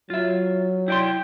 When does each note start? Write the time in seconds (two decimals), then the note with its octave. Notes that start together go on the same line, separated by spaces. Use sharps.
0.10 F#3 F4 E5
0.88 E4 D5 G5 C6